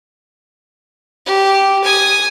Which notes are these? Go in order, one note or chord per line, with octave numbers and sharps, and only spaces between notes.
G4
G#5 D#6